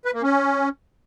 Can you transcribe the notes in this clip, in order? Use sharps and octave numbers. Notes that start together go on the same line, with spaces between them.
B4
A#3
C#4